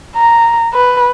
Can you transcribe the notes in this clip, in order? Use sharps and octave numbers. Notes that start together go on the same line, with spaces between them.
A#5
B4